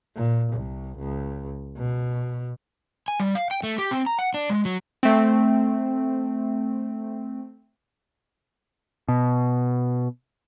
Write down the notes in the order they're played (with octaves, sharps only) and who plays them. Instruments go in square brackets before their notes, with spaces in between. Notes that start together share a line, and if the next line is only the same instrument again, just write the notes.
[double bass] A#2
C2
C#2
B2
[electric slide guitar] G#5
G3
F5
G5
A3
G4
C4
A#5
F#5
D4
G#3
F#3
[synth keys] A3 C4
[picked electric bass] B2